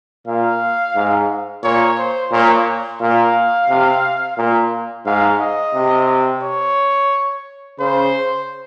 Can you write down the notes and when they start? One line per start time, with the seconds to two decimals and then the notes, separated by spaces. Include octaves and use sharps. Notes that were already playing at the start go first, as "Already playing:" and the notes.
0.27 A#2 F5
0.96 G#2
1.64 A#2 C#5
1.98 C5
2.32 A#2 C#5
3.01 A#2 F5
3.69 C3
4.38 A#2
5.06 G#2 F5
5.40 D#5
5.75 C3
6.42 C#5
7.79 C#3 C5